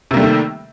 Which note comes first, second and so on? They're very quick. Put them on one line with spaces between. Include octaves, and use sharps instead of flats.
C3 A#3 G3 A3 D#3